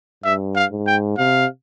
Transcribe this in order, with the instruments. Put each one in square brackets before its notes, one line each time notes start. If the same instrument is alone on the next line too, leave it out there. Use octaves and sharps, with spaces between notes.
[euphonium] G2 [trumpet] E5
[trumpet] F5
[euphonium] G#2
[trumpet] G5
[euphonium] C3 [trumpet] F5